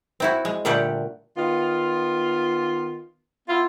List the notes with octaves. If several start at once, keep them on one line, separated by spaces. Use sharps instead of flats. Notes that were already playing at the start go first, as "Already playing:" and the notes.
C4 E4 F#4
G#3
A#2 D3 G3 A3 G4 F#5
D#3 B3 F4
B3 E4 F4